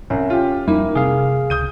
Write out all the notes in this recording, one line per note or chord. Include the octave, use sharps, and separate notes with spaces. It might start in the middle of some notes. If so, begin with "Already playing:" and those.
C2 C#4
F4 G4
F2 G3 A#3 D#4 E4
C3 G#4 F5
C#2 D#6 G6 D#7